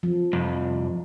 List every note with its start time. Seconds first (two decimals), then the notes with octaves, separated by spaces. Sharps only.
0.03 F3
0.33 C2 F2